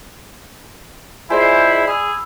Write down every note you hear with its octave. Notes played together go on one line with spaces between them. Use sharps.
G#3 E4 F4 G#4 C5 D5 G#5
G#4 B5 E6